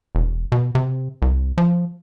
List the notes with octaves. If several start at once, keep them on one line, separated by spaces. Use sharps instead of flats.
E1
B2
C3
C2
F3